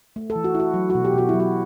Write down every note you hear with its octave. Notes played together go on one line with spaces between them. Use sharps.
A3
A4
E3
F#4
E4
F#4
F#3
F#4
B2
G4
B2 F#4
F#3 E4
F#4